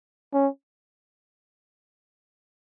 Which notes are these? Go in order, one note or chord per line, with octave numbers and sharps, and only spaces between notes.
C#4